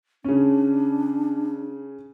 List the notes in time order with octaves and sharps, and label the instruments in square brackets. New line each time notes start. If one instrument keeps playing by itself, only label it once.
[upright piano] C#3 C#4 [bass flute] D4